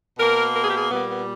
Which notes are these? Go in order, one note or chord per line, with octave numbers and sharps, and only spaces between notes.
B2 A#3 A#4
A#4
G#4
G4
G#4
A#2 G3 A#3 B3
B3